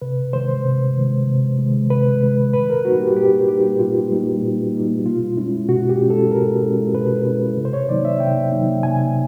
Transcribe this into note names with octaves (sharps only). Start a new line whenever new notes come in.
C3 B4
D#3 G#3 C5
C3
D#3 G#3
C3
D#3 G#3
C3 B4
D#3 G#3
A#2 B4
A#4
G3 A#3 D#4 F#4
G4
A#2 G4
G3 A#3 D#4 G4
A#2 F4
G3 A#3 D#4
A#2
G3 A#3 D#4
B2 F4
G#3 C#4 E4
B2 F#4
G4
G#3 C#4 E4
A4
B2 A#4
G#3 C#4 E4
B2 B4
G#3 C#4 E4
C3
C5
C#5
D#3 F#3 A#3 D#4 D5
E5
C3 G5
D#3 F#3 A#3 D#4
C3 G#5